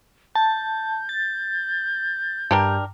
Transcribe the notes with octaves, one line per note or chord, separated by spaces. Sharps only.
A5 G6
A6
G2 D4 G4 A#4